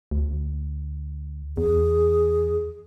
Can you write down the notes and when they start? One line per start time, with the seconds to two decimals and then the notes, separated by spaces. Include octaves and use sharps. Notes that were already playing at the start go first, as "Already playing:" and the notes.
0.11 D2
1.57 E2 G#4